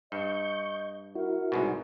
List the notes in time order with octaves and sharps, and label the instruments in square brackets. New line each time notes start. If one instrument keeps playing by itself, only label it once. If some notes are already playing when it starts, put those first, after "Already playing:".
[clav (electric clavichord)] G2 [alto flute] D#5 [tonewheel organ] C#6 G6
[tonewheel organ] E4 F#4 [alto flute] A#4
[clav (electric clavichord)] C2 G#2 B2